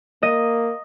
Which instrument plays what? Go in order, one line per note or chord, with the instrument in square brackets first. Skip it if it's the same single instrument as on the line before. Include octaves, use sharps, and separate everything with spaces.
[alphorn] A#3 [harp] D#5